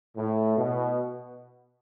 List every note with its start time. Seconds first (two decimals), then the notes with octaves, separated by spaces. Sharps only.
0.16 A2
0.57 B2